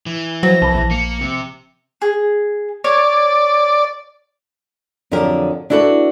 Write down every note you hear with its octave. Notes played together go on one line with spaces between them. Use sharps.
E3
F3 F#3 C5 A#6
C2 A5 B5
A#1
A#3 C#7
C3
G#4
C#5 D5
F2 D3 F#3 G4 A#4
D4 E4 F#4 A4 B4